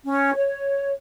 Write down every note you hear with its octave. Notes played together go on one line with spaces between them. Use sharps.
C#4
C#5